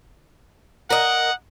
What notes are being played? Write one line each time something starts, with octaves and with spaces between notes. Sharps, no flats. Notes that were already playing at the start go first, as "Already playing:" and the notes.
A#4 D#5 F#5